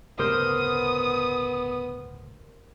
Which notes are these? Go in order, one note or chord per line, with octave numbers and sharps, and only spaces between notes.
D1 G1 C#3 B3 G4 A#4 C5 D#6